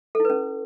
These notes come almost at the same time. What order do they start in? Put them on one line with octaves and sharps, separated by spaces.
A4 E4 B4 C#4